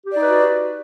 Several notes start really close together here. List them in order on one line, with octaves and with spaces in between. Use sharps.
G4 D5 D#4 B4 F#4